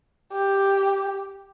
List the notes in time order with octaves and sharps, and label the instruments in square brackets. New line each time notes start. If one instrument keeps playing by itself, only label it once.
[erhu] G4